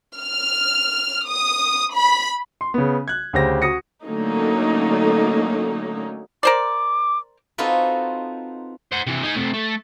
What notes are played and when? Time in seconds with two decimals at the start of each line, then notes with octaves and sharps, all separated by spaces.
0.16 F6
1.26 D#6
1.94 B5
2.61 C6
2.74 C#3 B3
3.08 F#6 G#6
3.33 D2 C#3 G4 C5 A#6
3.62 F#4 D#6 A#6 C#7
4.03 D3 F#3 A3 A#3 C#4 D#4
6.43 A#4 C5 D5 D6
7.58 C4 D#4 F4 F#4 A4 B4
8.92 C5 F#5
9.06 C3 E3
9.23 D#4 G#4
9.35 C3 A3
9.54 A3